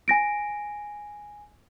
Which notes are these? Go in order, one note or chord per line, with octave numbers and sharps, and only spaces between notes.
G#5 A#6 D7